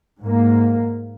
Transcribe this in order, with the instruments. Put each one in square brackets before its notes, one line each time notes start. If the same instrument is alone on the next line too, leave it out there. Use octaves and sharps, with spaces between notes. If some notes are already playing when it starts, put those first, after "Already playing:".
[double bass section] G#2 A#3